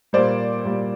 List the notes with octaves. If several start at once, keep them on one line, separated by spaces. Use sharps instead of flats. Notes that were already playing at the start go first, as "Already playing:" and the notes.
A#2 G3 C5 D5
A#2 G3